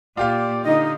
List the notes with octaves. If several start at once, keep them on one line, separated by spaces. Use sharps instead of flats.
A#2 F4 G4 D5 F5
D3 D#4 D#5